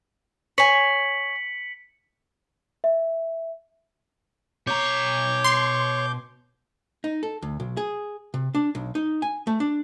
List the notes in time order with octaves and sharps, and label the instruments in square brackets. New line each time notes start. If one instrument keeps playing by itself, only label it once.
[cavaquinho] C#5 G#5 [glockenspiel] B6 C#7 F#7
[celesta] E5
[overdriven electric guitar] B2 A#5 [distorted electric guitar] C#5 [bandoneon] D6 G6
[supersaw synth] C6
[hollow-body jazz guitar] D#4
A4
D2
B1
G#4
C3
D4
B1
D#4
G#5
A3
D4